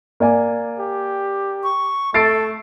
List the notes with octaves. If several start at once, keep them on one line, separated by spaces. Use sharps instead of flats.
A#3 D5 G#5
G4
C#6
A3 A4 A6 C7 D7